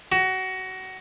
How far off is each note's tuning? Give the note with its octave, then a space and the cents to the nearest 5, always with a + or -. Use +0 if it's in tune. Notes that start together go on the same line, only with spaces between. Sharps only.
F#4 +25